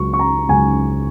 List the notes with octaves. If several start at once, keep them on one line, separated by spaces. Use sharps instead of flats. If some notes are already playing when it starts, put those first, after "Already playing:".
Already playing: C#2 C#3 F#3 C#6
C#6
A#5
C#2 C#3 F#3 G#5